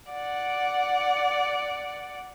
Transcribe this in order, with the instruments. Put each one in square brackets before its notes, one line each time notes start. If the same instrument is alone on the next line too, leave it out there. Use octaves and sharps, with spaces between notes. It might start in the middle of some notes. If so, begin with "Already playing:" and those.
[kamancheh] D5 F#5